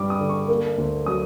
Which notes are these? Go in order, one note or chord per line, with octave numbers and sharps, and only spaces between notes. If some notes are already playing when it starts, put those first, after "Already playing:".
Already playing: G2 G3 D6
D#6
D3
C#6
A#3
D2
F#3 D#6